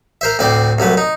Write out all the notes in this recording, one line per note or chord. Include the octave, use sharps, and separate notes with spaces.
A#4 C5 E5
D2 A2 C4 D5
C2 F#3 A3 B4
D#4